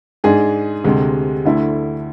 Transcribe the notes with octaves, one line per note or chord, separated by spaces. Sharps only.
G#2 G#3 D4 G#4
D2 C3 G#3
D2 D3 A3 E4